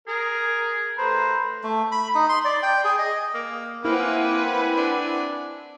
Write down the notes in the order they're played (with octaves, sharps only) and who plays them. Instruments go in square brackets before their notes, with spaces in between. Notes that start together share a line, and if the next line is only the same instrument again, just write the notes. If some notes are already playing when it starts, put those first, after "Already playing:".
[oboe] G#4 [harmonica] A#4
[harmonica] A3 B4 A#5 [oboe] C5
[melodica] A3
B5
D#4
C6
D5
G5
G#4
D#5
[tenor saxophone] A#3
[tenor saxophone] A#3 [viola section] C4 F#5 G#5 [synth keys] E4 [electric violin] B4
[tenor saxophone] D4